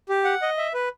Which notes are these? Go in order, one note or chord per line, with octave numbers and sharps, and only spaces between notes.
G4
F#5
D#5
E5
B4